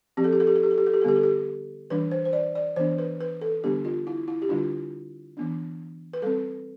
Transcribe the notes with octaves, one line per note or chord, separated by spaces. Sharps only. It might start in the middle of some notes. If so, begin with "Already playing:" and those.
F3 C4 G4
A4
G4
A4
G4
A4
G4
A4
G4
A4
G4
A4
D3 G3 B3 G4
A4
G4
E3 G3 D4 B4
C5
C5
D5
D5
E3 B3 D4 C5
B4
B4
A4
D3 G3 B3 D4 G4
F4
E4
E4
G4
D3 G3 D4 F4
E3 B3 D4
B4
G3 C4 A4